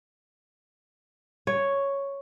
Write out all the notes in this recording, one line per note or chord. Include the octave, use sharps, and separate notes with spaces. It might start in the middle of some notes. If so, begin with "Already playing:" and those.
C#5